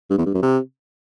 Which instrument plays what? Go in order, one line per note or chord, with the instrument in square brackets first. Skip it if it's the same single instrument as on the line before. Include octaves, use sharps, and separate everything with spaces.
[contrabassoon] G2
E2
G2
F#2
C3